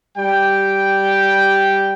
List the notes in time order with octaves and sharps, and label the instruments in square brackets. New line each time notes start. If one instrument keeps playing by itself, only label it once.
[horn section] G3 G5